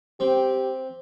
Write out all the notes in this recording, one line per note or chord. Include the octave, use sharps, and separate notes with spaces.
C4 G4